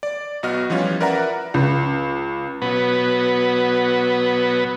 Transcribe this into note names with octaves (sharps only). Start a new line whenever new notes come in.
D5
B1 B3 F#4 D#5 F6
E3 F3 G3 C#4 F4
A#4 B4 D5 E5 F#5 A#5
C#2
B2 F#3 B3